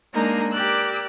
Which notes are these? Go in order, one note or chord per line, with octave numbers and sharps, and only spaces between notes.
G#3 A#3 D4 D#4
G4 A#4 D5 E6 F#6